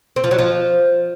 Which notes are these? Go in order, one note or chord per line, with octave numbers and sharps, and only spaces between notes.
C4
F3
F#3
F3